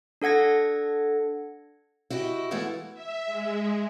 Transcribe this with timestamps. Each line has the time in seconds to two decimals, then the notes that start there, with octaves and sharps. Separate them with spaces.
0.22 D4 A4 F#5 G#6 A#6
2.10 E4 F#4 G4 D#5
2.51 E3 G#3 A3 B3 E4 F5
2.93 E5
3.26 G#3